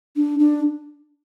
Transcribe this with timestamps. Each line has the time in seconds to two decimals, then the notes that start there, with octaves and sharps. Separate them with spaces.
0.16 D4
0.39 D4